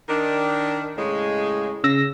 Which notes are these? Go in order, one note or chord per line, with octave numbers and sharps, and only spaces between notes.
D#3 D4
A2 C#3 G#3
C#3 E6 A#6